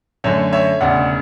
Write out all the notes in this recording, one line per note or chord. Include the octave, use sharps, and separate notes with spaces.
F#2 D3 A3 C#5 E5
C#5 E5
E1 D2 C#3 D5 F#5